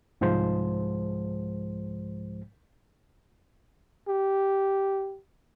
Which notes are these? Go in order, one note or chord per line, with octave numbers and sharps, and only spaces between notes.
C2 G#2 F3 G#3 C5
G4